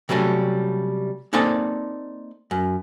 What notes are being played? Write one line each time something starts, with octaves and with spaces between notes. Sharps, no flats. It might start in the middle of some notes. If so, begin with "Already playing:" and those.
C3 F#3 G3 A3 C#4
A#3 C4 D#4 A4 D5 G#5
F#2